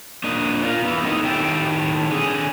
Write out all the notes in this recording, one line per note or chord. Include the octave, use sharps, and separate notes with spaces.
A#3 D4 D#5
F4 A#4
B3 D#4 E4
A#3 C4 D#4 A4 D#5
A2 D#3 G4 A4 E5 G5
D3 G#4